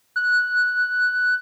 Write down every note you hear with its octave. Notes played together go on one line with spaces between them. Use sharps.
F#6